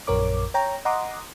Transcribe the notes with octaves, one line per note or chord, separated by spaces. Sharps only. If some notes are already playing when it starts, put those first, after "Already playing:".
A#1 F#2 A#4 C#5 D6
C#5 G5 A#5
D#5 F#5 A#5 C6 D6 D#6